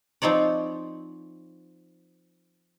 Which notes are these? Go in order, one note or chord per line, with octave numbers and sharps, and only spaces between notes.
F3 C4 D#4 C#5 D5